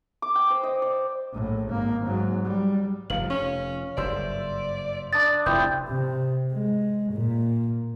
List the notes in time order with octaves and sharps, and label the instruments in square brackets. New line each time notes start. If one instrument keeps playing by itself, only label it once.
[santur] D6
G5
C5
D#5
D5
[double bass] A#1 A2
G#1 A#3
G#2 F#3
G3
[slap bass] F1 C3 F3 [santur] F5 [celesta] F#7
[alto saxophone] C#4
[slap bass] F#1 G2 [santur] C5 E5 [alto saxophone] D5
[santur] D4 D#6 [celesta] A6
[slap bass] F1 [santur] C4 E4 [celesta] D#6 G6
[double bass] C3
G#3
A#2